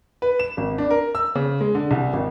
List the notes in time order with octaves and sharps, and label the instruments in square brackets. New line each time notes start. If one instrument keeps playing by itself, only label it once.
[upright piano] B4
E7
G#1
D4
A#4
E6
C#3
G#3
D3
C2
G#1